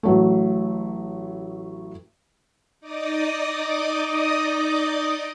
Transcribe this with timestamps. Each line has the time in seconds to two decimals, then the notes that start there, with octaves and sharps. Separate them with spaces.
0.03 A1 F#3 A3
2.80 D#4 D5 D#5 D6 D#6